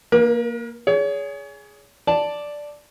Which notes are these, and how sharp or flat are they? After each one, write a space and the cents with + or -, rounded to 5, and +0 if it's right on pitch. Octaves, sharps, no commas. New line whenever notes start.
A#3 +0 A#4 +45
G#4 +0 C#5 +35
D5 +0 A5 +0